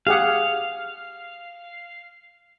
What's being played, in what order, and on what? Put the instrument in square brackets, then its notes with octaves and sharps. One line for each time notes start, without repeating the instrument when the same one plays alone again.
[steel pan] G4 G#4 F#5 [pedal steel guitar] F5